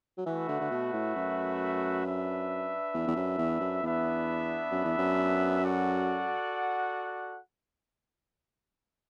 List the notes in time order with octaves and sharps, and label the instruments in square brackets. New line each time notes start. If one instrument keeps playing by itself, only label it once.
[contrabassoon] F#3
[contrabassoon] E3 [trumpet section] A3 F#4 B4 E5
[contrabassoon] D3
D3
B2
A2
F#2
[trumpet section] D4 B4 E5
[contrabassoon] E2
E2
F#2
E2
F#2
[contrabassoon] E2 [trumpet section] B3 D4 B4 E5
[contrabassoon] F#2
E2
F#2
[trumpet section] F#4 A4 D5 F#5